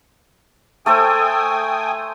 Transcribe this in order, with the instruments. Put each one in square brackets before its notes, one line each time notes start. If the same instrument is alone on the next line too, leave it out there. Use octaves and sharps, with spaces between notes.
[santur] A3 A4 C5 [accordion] G5 G#5 D#6